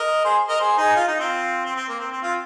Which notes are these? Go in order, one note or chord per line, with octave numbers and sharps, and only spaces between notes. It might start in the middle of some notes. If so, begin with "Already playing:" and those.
Already playing: A#4 D#5
G#4 C5
A#4 D#5
G#4 C5
D#4 G#4
F4
D#4
C4 F4
C4
C4
A#3
C4
C4
C4 F4